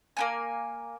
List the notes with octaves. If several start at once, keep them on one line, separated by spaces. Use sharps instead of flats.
A#3 B3 G#5